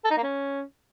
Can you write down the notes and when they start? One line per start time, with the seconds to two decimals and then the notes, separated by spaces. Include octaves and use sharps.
0.05 A4
0.11 D#4
0.17 A#3
0.23 C#4